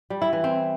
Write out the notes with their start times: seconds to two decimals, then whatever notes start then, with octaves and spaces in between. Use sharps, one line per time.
0.10 G3
0.22 E4
0.33 E3
0.44 C4